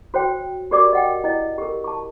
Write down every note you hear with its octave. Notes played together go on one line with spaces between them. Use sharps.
F#4 C5 C#5 G5
F#4 G4 A#4 D5 D6
D#5 F#5 G5
E4 D#5
G4 A#4
A5 C#6